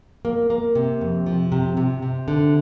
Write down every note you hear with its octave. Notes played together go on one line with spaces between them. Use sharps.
A#3
A#3
C3
F2
F3
C3
C3
C3
D3